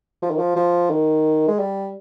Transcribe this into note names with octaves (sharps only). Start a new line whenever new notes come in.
F3
D#3
F3
F3
D#3
G#3
G3